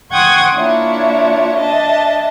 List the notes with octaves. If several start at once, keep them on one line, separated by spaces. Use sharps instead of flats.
F#5 G5 C6 C#6 D#6 G#6
A#3 D4 E4 F4 C#5
D4 D#5 E5 A5